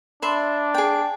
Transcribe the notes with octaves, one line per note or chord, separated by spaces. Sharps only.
D4 E5 B5 C6
G#4 G5